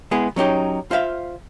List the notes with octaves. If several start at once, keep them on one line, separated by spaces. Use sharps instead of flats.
G#3 B3 E4 G#4
F#3 C#4 D#4 G4
F4 C5 E5 F5